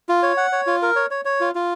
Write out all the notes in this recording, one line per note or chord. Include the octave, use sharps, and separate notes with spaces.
F4
C#5
F#5
C#5
F4
A#4
C#5
C#5
C#5
F4
F4